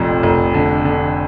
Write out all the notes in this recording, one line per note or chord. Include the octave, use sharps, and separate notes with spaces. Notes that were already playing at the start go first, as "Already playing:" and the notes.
Already playing: F1 A#1 F2
F1
D3
D3